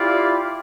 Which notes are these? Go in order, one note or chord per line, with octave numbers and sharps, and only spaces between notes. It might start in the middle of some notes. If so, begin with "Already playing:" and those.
Already playing: E4 F4 G4 D5